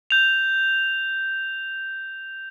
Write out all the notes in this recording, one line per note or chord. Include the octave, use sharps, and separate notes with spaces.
G6 F7